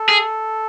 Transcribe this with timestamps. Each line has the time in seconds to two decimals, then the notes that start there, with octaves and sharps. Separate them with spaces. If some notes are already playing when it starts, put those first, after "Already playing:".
Already playing: A4
0.09 G#4